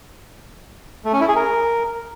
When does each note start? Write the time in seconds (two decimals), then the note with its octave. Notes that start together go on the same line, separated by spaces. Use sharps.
1.05 A3
1.13 C#4
1.20 E4
1.28 G#4
1.36 A#4